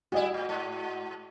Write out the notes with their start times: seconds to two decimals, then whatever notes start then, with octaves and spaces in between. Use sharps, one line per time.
0.12 G3 E4 F#4 D#5
0.34 A2
0.49 G#2